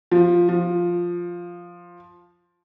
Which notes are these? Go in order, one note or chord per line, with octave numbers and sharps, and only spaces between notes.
F3
F3